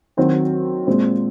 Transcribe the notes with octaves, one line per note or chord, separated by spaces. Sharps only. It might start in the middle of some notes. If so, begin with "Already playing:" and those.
D#3 F#3 C4 F#4
A#2 G#3 C4